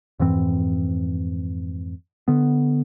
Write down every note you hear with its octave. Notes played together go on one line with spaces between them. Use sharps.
F2 G#2 E3 C4
D3 B3